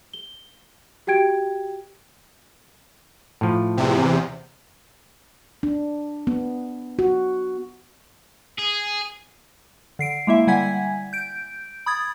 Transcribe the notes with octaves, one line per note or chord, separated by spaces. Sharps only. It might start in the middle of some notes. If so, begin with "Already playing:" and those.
G7
F#4 G4 G5 G#6 D7
A2 F3
E2 C3
D4
B3
F#4
G#4
D3 C7 D7
G#3 A#3 E4 E5
D3 G3 F#5 G#5 G#6 B6
G6 D7
B5 D#6 G#6 A6